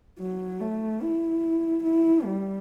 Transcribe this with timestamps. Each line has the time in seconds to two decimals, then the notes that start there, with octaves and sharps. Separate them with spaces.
0.19 F#3
0.61 A3
1.02 E4
1.84 E4
2.25 G3